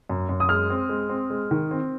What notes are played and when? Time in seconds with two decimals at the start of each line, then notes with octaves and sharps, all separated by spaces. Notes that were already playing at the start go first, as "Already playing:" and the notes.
0.09 F#2
0.29 F#2
0.40 D#6
0.49 G#3 F6
0.70 C4
0.89 G#3
1.09 C4
1.30 G#3
1.51 D#3
1.71 C4